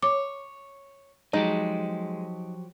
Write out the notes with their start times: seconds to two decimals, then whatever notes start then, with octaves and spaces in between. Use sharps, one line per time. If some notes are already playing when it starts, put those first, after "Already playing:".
0.03 C#5 D6
1.33 F3 F#3 G#3 D#4 G4